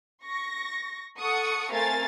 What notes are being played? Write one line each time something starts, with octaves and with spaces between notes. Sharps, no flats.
C#6 A#6
A4 F#5 C#6 D#6 C#7
A3 C4 A#4 F5 G#5 A6